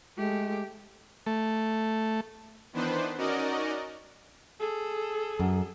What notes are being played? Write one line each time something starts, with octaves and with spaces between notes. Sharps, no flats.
G#3 A3 G4
A3
D#3 E3 B3 D4 B4 C5
C#4 D#4 F#4 A#4 D5 D#5
G#4 A4
F#2